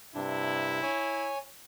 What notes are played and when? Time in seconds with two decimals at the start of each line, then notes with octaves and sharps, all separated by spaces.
0.15 G2 C3 D4 E4
0.83 C#5 G#5